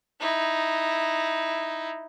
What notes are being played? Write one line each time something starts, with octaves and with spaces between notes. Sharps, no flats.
D#4 E4